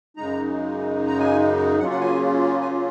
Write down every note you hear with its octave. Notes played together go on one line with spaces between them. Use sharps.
F#2 C#3 G#3 D#4 A#5
A#5
G#5
C#3 F#3 A#3 C#4 F4 F#5
F#5
G#5
G#5